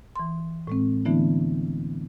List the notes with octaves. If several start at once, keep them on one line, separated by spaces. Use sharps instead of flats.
E3 C6
A2 G#3 C4
D3 E3 A3 B3 D4 E4